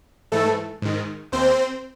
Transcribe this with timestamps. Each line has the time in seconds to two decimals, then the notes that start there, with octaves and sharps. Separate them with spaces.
0.32 G#2 E3 A3 A4
0.82 G#2 D#3
1.32 D#2 C4 C5